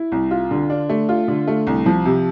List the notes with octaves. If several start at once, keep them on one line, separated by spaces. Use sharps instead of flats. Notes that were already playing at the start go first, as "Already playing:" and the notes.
Already playing: E4
C2
F4
D3
D4
A3
F4
D3
A3
C2
F3
C3